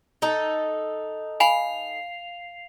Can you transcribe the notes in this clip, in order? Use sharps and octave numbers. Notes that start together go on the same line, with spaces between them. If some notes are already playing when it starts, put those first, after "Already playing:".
D#4 A4
F5 G#5 B5 C7 F7 F#7